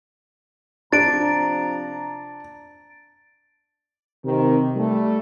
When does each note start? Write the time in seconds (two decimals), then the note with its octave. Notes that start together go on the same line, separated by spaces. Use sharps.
0.92 C3 F3 D4 A#5 A6 D7
4.25 C3 D#3
4.76 G3 A3